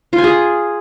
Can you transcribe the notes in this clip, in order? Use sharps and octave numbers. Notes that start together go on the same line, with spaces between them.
F4
G#5
G#4